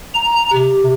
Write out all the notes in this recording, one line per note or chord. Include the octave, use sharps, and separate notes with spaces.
A#5
C3